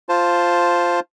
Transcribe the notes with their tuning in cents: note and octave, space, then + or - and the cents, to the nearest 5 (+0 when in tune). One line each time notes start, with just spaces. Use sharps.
F4 +0 C5 +0 A5 +0